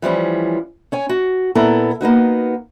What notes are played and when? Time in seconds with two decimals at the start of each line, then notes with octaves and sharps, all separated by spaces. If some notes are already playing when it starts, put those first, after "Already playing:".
0.02 E3 F3 G3 C#4
0.92 C#4 C#5 G#5
1.09 F#4
1.55 A#2 B3 E4 A4 A#5
2.01 A#3 B3 D#4 F#4